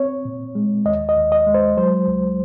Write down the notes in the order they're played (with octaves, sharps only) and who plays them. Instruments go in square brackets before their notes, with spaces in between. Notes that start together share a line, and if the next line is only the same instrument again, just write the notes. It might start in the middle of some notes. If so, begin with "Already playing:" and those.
Already playing: [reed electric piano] C4 C#5
A#2
G#3
D#2 D#5
D#5
D#2
D#5
G#3
C5
F#3 C5
C#2